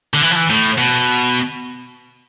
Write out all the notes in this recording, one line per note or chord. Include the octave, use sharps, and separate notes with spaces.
D3
E3
F3
E3
A2
B2